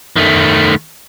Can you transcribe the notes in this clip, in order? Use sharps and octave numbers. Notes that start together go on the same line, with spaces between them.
D#3 A3